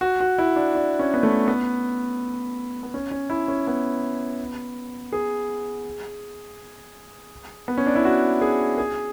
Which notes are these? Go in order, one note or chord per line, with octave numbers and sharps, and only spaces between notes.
F#4
F#4
E4
D4
D4
C#4
B3
A3
B3
B3
C#4
C#4
E4
C#4
B3
G#4
B3
C#4
D4
E4
F#4
G#4
G#4